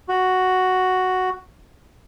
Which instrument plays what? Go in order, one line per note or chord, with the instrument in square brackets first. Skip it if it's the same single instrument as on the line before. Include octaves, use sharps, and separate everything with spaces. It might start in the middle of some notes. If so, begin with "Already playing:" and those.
[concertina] F#4